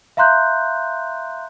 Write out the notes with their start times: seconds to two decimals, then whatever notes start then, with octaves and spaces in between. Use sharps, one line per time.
0.17 E5 F5 A#5 C6 F#6 G6